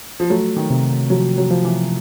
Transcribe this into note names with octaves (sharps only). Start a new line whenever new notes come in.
F3
F#3 A3
D#3
C3
F3 F#3
F#3
F3
E3